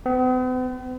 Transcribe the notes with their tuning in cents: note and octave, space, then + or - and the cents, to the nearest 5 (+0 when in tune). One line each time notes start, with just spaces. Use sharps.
B3 +45